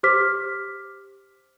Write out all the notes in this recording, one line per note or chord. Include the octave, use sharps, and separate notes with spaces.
G4 C5 D6 F6 B6